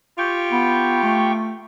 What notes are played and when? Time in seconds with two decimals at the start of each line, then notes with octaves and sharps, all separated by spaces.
0.18 F4 G4 G5 C#6
0.52 B3
1.03 A3